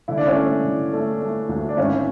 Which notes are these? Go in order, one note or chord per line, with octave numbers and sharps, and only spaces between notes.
D3 E4
D4
C#4 E4
A3
D3
A3
A3
D2
D4
G#1 C#4 E4